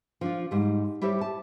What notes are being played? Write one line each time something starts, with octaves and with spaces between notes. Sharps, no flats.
F3 D4 F4
G#2 G3
G3 E4 G4 C5 C#5
A5